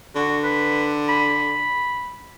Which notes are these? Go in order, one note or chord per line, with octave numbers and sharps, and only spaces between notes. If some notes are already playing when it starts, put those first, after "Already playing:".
D3 F#4
B4
B5